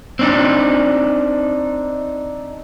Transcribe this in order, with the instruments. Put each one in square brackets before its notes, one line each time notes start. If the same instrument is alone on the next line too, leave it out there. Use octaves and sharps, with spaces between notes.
[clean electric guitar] C4 D4 D#4